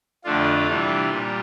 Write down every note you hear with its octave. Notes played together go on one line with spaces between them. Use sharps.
F2 D3 A3 D4 F4
C3 E3 G3 D4
A#2 G3